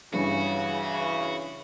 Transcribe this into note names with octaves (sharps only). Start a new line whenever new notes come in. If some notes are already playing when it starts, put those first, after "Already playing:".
G2 C#3 E3 F#4